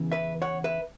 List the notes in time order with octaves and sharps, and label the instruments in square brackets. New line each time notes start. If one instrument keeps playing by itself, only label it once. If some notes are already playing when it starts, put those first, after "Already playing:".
Already playing: [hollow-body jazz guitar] E2 C#3 E3
B4 E5
C#5 F#5
B4 E5